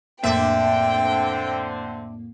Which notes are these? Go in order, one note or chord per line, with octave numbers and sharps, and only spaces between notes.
F2 A2 D3 A#3 C4 D4 E5 G5